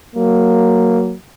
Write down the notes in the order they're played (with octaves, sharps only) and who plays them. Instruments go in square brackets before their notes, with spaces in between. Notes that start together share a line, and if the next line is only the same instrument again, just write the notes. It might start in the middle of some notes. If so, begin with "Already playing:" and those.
[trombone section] F#3 A#3